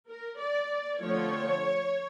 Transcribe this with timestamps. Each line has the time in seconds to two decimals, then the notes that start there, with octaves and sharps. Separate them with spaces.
0.09 A#4
0.39 D5
1.01 D3 F3 A3 C4 C#5